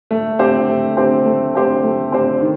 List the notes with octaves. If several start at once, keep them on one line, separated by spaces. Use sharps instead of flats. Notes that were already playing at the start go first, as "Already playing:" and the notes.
A3
C4 G4 C5
A3
C4 G4 C5
A3
C4 G4 C5
A3
C4 G4 C5
D#3